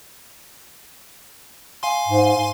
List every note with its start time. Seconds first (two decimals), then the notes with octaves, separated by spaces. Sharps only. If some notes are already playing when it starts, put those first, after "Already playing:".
1.83 F5 G#5 C6
2.08 G#2